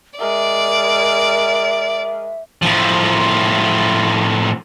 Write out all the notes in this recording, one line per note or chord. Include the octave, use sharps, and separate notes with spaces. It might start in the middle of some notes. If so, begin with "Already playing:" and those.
G#3 A#4 D5 E5
A2 F3